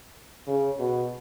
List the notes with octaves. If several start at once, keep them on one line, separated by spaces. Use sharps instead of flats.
C#3
B2